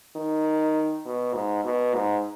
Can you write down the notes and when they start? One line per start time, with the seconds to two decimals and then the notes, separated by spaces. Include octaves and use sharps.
0.16 D#3
1.05 B2
1.34 G#2
1.64 B2
1.94 G#2